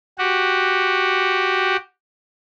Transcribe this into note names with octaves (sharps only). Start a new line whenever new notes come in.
F#4 G4